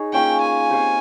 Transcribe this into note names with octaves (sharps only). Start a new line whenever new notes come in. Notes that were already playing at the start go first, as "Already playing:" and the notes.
Already playing: D#4 G#4 C#5
A#3 C#4 F4 G5
G#5
C4 G4 C#5 F5